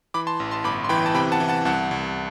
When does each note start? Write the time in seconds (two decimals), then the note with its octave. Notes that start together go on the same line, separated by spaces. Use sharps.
0.14 E3 B5 D6
0.27 A5 C6
0.40 A1
0.51 A5 C6
0.64 G1 B5 D6
0.84 C6
0.89 E3 G5 B5
1.06 A5
1.15 C3 G5 B5
1.32 F#5 A5
1.40 E3
1.48 F#5 A5
1.65 C2 F#5 A5
1.91 C2